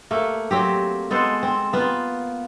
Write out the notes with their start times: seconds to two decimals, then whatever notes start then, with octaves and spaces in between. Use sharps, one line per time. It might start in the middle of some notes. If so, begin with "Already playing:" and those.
0.11 A3 A#3
0.51 F#3 C4 G4
1.11 G#3 B3 A4 C5
1.43 C4
1.73 A#3 B3 F4